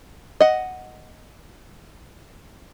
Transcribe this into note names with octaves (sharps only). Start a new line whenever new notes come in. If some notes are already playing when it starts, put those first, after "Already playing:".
D#5 F#5